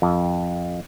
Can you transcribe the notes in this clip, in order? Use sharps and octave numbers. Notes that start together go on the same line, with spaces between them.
F2